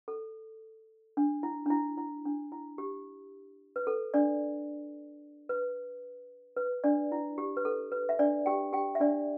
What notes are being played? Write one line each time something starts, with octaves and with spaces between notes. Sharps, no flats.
A4
D4
E4
D4
E4
E4
D4
E4
G4
B4
A4
D4 D5
B4
B4
D4 D5
E4
G4
B4
A4
B4
E5
D4 D5
G4 G5
G4 G5
E5
D4 D5